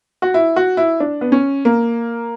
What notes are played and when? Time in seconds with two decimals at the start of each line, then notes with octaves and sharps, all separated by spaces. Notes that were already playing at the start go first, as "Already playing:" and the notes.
0.22 F#4
0.34 E4
0.56 F#4
0.77 E4
1.00 D4
1.21 B3
1.32 C#4
1.65 A#3